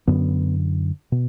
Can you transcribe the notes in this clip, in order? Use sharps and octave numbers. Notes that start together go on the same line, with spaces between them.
F#2 D3 B3
B2